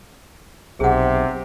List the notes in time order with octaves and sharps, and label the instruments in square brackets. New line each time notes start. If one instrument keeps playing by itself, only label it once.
[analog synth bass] B1 [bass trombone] C3 [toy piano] G#4 F#5